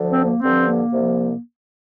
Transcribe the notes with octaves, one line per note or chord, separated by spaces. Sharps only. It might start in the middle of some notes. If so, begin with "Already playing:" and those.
Already playing: D2 D3 F3
C4
A#3
G2 D3 F3 C4
A#3
C2 C3 F3